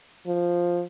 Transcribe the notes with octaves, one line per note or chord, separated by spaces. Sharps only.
F3